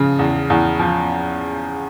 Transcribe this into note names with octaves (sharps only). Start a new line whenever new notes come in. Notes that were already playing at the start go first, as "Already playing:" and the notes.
Already playing: C#3 F3
E2
E2
F3